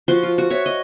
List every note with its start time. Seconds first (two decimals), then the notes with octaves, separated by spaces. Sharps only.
0.08 F3 F#4 C6
0.23 F4
0.38 F#4
0.50 C#5 E5 C#6
0.66 D#5